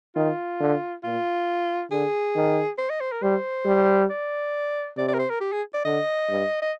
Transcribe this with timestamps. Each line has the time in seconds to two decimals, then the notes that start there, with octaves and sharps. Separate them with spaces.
0.16 D#3 F4
0.60 D3
1.03 A#2 F4
1.91 D3 G#4
2.35 D#3
2.78 C5
2.90 D#5
3.01 C5
3.12 A#4
3.22 G3 C5
3.66 G3
4.10 D5
4.97 C3 D5
5.08 D5
5.14 A#4
5.19 C5
5.30 A#4
5.41 G4
5.52 G#4
5.74 D5
5.85 D3 D#5
6.29 G2
6.62 D#5